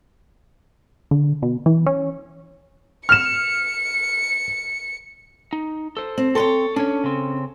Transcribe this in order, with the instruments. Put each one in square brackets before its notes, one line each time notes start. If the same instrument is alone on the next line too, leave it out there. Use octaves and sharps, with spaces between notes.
[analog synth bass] D3
B2
E3
C#4
[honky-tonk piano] F6 E7 [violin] C#7
[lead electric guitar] D#4
A4 C5
[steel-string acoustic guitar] C4
[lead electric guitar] C4 C6 [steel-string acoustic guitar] A4 B4 C#5
[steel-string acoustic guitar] C#4 [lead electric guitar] D4 C#5
[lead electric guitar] C#3 C4